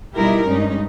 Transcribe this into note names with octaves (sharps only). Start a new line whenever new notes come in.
B2 G3 D#4 E4 G4 A#4
G2 G3 G#3 C#4 D#4